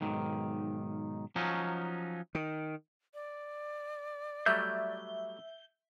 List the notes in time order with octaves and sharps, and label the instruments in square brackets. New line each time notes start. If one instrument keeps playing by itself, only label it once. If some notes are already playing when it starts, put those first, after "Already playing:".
[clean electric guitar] B1 G#2 D#3
F3 F#3 C#4 D#4
[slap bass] D#3
[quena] D5
[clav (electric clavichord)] F#3 G3 A3 [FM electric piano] E5 [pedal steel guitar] G6